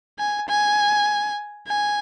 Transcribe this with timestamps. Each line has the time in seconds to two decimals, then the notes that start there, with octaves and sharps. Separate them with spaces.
0.19 G#5
0.49 G#5
1.67 G#5